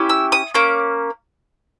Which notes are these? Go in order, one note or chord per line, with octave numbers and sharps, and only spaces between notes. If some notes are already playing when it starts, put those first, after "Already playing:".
Already playing: C#4 E4 G4
E6
D#6
A#3 C#4 D6